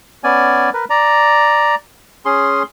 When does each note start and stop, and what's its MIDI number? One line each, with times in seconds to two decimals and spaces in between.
0.24 0.70 59
0.24 0.70 61
0.24 0.70 74
0.24 0.70 80
0.74 0.85 70
0.74 0.85 71
0.90 1.75 74
0.90 1.75 82
2.25 2.63 61
2.25 2.63 68
2.25 2.63 84